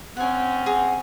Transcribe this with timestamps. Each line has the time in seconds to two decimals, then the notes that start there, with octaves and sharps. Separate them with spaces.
0.17 C4 C#4 F#5 G#5
0.66 G#4 F#5 A#5